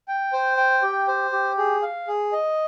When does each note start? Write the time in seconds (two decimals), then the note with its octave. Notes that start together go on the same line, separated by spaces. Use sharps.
0.08 G5
0.33 C5
0.57 G5
0.82 G4
1.08 C5
1.32 G4
1.58 G#4
1.83 F5
2.08 G#4
2.33 D#5